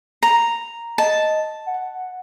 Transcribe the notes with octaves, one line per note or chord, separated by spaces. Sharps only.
A#5
D#5 A5
F#5